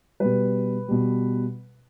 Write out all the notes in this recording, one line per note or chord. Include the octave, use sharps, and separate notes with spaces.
B2 G3 B4
B2 G3